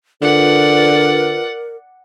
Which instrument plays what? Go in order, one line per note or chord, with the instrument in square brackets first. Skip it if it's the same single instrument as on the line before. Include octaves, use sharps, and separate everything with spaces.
[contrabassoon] D3 [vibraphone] F4 B4 [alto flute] A#4 [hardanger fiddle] D5 F#5